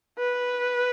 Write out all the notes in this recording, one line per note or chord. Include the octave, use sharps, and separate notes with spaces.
B4